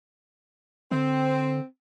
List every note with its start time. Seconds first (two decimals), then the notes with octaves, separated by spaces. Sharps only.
0.91 D3 C4